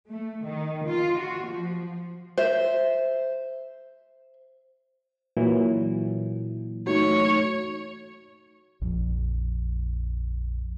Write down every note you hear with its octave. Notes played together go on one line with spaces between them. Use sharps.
A3
D#3
F4
F#4
F3
C5 E5
A#2 E3 F#3
A3 D#4 F#4 C#5
A#1 F2 F3